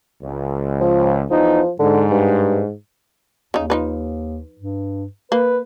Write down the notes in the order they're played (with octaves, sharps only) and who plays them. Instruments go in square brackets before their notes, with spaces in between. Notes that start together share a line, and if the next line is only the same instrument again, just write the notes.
[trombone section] C#2
[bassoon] F3
[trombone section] E2 E3 D#4 [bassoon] F3
[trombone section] G#2 [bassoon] D3
[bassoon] G2
[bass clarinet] D#2 [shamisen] C#3 D#4
[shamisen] F3 D#4 B4
[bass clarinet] G2
[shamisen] A#3 [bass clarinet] B4